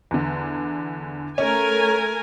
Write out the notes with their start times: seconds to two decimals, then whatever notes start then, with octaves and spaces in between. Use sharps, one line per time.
0.11 E2 D3
1.38 A3 C#4 A#4 G#5